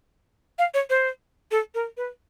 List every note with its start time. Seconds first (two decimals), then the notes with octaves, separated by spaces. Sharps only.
0.59 F5
0.74 C#5
0.90 C5
1.51 A4
1.75 A#4
1.97 B4